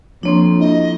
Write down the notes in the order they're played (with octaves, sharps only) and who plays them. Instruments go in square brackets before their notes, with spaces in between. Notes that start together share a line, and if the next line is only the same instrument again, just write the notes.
[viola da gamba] F2 [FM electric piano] F3 C#5 C6 [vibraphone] A#3 D4
[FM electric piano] E4 [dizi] D#5